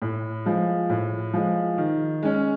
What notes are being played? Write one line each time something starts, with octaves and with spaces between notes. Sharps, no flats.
A2
F3 G#3
A2
F3 G#3
D#3
G#3 C#4